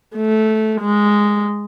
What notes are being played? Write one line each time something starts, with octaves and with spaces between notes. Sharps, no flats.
A3
G#3